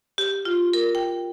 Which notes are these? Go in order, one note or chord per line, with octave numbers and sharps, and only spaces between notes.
G4
F4
A#4
G5